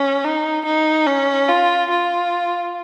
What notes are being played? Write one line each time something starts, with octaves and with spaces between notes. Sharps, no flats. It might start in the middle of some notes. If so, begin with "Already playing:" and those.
Already playing: C#4
D#4
D#4
C#4
F4
F4